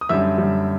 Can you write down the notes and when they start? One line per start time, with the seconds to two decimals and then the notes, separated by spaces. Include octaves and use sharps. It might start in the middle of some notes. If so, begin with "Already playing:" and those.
0.01 D#6
0.09 F#2 D3 G3 E5 E6
0.38 F#2 D3 G3